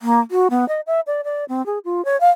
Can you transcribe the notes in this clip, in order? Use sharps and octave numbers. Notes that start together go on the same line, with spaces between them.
A#3
F#4
B3
D#5
E5
D5
D5
C4
G#4
F4
C#5
F5